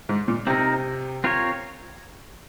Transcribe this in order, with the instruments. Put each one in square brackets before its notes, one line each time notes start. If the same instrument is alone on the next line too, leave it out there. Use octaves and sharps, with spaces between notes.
[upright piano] G#2
A#2
[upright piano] C3 [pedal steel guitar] C4 D#4 A#4
[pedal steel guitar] C4 F4 A#4 C#5